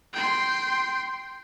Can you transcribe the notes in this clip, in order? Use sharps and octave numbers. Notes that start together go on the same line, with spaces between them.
G5 C6